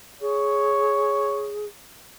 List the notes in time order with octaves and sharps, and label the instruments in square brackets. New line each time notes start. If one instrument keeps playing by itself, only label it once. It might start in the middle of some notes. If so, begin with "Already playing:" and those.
[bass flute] G#4 [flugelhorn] C#5